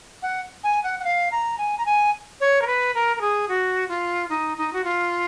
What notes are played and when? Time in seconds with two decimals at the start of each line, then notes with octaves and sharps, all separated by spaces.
0.22 F#5
0.63 G#5
0.83 F#5
0.99 F#5
1.04 F5
1.31 A#5
1.58 G#5
1.78 A#5
1.85 G#5
2.40 C#5
2.61 A#4
2.66 B4
2.94 A#4
3.16 A#4
3.21 G#4
3.48 F#4
3.88 F4
4.29 D#4
4.57 D#4
4.73 F#4
4.84 F4